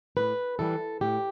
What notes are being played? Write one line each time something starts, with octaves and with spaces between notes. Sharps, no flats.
A2 B4
E3 G3 A4
A2 G4